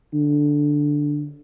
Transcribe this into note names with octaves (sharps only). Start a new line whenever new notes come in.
D3